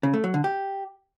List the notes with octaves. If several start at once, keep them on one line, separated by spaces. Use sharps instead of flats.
C#3
A3
F#3
D3
G4